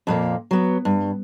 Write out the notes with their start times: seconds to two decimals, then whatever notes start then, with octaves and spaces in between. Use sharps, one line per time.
0.07 F2 A#2 A#3
0.51 F#3 B3
0.85 G2